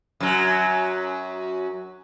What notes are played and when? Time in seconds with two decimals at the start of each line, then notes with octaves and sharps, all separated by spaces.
0.20 F#2 F#3